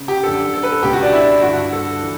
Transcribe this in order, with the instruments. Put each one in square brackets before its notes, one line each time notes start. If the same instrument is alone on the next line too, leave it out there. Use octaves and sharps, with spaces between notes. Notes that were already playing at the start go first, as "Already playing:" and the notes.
Already playing: [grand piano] C#3
G4
F#2 D3 A4
A4
B4
A4
C#2 B2 G4
F#4
D4
E4
G2 D3 F#4
A4
E3